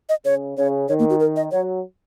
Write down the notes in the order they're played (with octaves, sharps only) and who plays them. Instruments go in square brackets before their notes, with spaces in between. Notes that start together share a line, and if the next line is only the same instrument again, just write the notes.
[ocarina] D#5
[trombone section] C#3 [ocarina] C#5
[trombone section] C#3 [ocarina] C#5
[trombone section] D#3 [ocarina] C#5
[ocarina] A#3
F#4
A#4
D#5
[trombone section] F#3 [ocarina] C#5